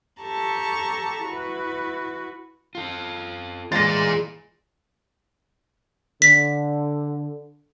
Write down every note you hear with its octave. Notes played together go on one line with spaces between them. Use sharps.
G4 A4 A5 A#5 C#6
E4 F#4 B4
F4 A4
E3 G#3 F4 D5 C6 A6 A#6
D3 B6